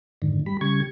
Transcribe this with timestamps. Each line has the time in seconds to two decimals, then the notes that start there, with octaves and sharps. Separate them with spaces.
0.22 F2 G#2 D3 D#3
0.46 G3 B5
0.61 C#3 G3 C#6 G#6